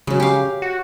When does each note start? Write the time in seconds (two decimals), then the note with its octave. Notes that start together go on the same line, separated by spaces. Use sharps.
0.07 C#3 F#3 G#3
0.20 G4 F5
0.62 F#4